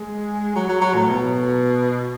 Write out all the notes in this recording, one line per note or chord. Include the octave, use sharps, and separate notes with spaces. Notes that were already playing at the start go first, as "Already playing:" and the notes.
Already playing: G#3
F#3
F#3
F#3
A2
B2